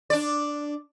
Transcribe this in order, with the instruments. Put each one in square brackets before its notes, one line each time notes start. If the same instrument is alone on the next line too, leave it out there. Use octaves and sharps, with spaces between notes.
[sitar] D4 D5